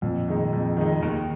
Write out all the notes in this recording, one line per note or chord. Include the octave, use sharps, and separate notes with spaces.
F2 A#2
D#3 G#3 D#4
F2
D#3 G#3 D#4
D#2 D#3